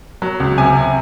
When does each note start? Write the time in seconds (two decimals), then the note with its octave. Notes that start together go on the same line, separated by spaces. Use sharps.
0.22 F#3
0.40 C#2
0.58 C3 G#5
0.76 C3